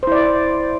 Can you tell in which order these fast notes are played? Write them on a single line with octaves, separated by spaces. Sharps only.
C5 E4 D5